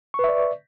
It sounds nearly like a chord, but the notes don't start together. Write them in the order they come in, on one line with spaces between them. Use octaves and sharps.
C#6 B4 E5 D5